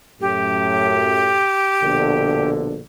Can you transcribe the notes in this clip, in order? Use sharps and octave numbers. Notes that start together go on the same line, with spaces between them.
F#2 A2 G4
A#1 B2 D3